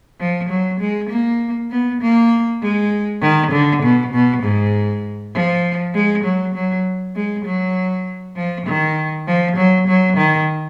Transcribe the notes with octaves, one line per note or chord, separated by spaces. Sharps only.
F3
F#3
G#3
A#3
B3
A#3
G#3
D#3
D3
B2
B2
G#2
F3
G#3
F#3
F#3
G#3
F#3
F3
D#3
F3
F#3
F#3
D#3